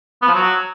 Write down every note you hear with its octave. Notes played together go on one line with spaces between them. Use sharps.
B3
F3
F#3